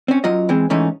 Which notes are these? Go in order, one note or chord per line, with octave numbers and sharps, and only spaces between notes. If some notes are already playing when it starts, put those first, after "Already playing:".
C4 C#4
F#2 F#3 F4 D#5
E3 G#3 C4
G#2 E3 A3 C#4 D#4